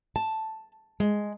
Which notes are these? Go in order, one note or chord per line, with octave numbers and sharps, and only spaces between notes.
A5
G#3